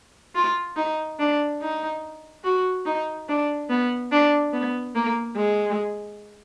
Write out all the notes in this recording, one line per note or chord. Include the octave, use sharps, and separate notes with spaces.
F4
D#4
D4
D#4
F#4
D#4
D4
B3
D4
B3
A#3
G#3